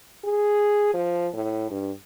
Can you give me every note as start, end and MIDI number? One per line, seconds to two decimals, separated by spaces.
0.24 0.91 68
0.94 1.28 53
1.34 1.68 45
1.71 1.91 43